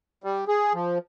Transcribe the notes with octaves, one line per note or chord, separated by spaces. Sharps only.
G3
G#4
F3